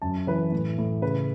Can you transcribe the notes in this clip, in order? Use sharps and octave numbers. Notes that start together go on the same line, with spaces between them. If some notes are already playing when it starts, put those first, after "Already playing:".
F#2 A5
E3 B4
A2
A2
C#3 B4